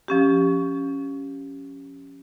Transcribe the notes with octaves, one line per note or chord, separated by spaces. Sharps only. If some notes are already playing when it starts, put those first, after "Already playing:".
F3 C#4 G4